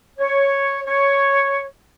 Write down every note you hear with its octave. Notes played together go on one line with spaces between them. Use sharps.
C#5
C#5